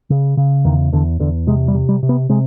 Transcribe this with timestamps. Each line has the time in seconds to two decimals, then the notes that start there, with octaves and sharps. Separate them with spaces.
0.10 C#3
0.37 C#3
0.65 E2 D#3
0.92 E2 D3
1.20 E2 D3
1.47 C3 G#3
1.68 G3
1.75 C3
1.89 G3
2.03 C3
2.09 B3
2.29 C3 G#3